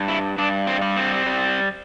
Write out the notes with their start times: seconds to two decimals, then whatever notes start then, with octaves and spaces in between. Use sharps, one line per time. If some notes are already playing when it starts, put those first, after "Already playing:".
Already playing: G2
0.08 E4
0.38 G2 D4
0.67 C4
0.82 G3
0.96 C4
1.26 G3